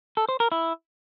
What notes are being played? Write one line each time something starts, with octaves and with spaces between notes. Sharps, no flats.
A4
C5
A#4
E4